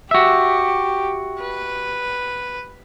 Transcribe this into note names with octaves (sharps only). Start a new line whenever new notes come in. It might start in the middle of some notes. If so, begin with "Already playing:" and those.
F#4 G4 E5
B4